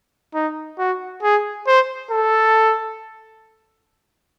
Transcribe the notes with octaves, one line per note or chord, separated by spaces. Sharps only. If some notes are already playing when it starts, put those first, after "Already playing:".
D#4
F#4
G#4
C5
A4